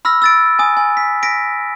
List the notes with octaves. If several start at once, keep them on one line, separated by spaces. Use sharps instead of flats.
B5 E6 F6 A#6
E6 A6 D7
G#5 D#6
G#5
B6
A#6 B6 D7